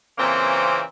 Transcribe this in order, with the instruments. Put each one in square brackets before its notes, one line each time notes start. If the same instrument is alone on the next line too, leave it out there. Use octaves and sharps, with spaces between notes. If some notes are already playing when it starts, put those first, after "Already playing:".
[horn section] A#2 C#3 E3 A#3 C4